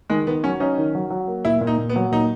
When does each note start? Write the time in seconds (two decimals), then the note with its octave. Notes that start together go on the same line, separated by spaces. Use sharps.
0.10 D#3 G#3
0.27 D#3 B3
0.44 F#3 C#4
0.60 C#4 D#4
0.78 D#3
0.95 F#3
1.10 F#3
1.27 A#3
1.45 A#2 E4
1.61 A#2
1.67 D#4
1.78 A#2
1.90 B3
1.96 F#3
2.12 A#2 D#4